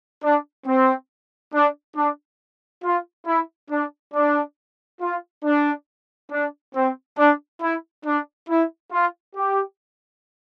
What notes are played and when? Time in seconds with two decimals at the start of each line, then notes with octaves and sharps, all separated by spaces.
0.23 D4
0.67 C4
1.54 D4
1.97 D4
2.84 F4
3.27 E4
3.71 D4
4.14 D4
5.01 F4
5.45 D4
6.32 D4
6.75 C4
7.18 D4
7.62 E4
8.06 D4
8.49 E4
8.93 F4
9.36 G4